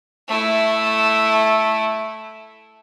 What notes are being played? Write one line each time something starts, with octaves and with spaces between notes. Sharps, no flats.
A3 E4